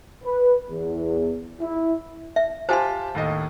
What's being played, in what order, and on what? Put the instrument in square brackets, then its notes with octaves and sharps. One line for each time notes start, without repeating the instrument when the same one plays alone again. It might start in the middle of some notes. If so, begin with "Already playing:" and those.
[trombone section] B4
E2
E4
[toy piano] E5
[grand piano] F4 G4 A5 [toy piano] C5 G#5 C6
[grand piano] D#2 A2 D#5